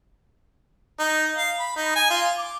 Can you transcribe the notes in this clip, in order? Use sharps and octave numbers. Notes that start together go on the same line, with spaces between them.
D#4
F5
B5
D#4
G#5
F4
D6